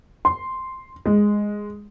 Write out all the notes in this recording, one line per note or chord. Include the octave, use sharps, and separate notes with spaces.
C6
G#3